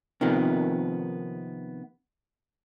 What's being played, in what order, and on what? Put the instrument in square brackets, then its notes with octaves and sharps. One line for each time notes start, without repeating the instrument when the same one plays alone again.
[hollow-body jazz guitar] C3 D#3 F3 A#3 B3